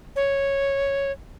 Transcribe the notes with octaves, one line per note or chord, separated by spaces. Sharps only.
C#5